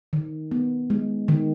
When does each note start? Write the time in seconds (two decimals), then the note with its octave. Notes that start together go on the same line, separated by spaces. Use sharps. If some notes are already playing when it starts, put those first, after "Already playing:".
0.13 D#3
0.52 B3
0.90 G#3
1.28 D#3